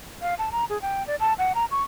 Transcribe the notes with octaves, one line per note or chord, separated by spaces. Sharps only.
F5
A5
A#5
G#4
G5
D5
A5
F#5
A#5
C#6